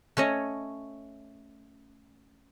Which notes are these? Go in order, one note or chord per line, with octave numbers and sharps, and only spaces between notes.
A3 C#4 C#5 D#5